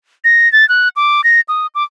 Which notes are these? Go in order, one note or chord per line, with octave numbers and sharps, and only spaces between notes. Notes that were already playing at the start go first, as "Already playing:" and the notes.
A#6
A6
F#6
D6
A#6
D#6
D6